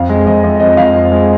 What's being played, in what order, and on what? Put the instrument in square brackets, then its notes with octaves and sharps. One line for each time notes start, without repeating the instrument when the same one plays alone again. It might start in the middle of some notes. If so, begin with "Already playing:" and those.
Already playing: [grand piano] F2 F5
G#3
F2 D#5
F2
F3 D#5
F2 F5
F3
G#3